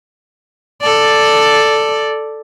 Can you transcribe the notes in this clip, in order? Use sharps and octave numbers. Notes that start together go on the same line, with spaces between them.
A4 D5